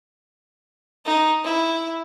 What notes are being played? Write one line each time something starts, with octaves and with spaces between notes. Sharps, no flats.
D#4
E4